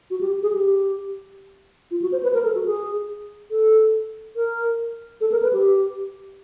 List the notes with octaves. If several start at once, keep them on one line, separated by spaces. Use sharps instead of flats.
F#4
G4
G#4
G4
F4
F#4
C5
B4
A#4
A4
F#4
G#4
A4
A#4
A4
A#4
B4
G4